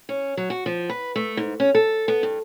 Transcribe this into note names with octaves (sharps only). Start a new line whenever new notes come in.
C#4
F#3
F#4
F3
B4
A3
G#2
C#4
A4
B3
G2